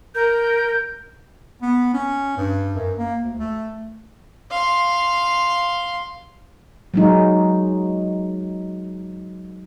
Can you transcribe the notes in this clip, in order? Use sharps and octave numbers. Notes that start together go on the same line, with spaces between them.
A#4 G6
B3
C#4
G2
F#2
A#3
D2
A3
F5 C6
F#3 G#3 D#4